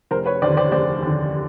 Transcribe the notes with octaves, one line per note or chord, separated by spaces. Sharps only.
F1 A#4 C5
B4 C#5
D#2 D3 C5 D5
C5 D5
F1 C5 D5
D#2 D3